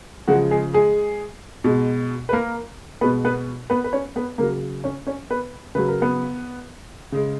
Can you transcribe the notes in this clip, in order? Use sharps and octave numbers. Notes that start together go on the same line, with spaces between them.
C#3 F3 F#3 G#3 F#4
G#3 G#4
G#3 G#4
B2 G#3
B4
A#3 A#4
B2 G#3 B3 B4
B3 B4
B3 B4
B4
C#4 C#5
B3 B4
C#3 F#3 A#3 A#4
C#4 C#5
C#4 C#5
B3 B4
C#3 F#3 B4
A#4
B3 B4
C#3 G#3